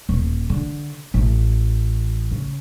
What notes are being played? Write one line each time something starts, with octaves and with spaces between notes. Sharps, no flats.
D#1
D3
A1
C#3